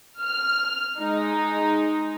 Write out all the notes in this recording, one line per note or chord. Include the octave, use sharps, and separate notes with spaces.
F6
G#3 D#4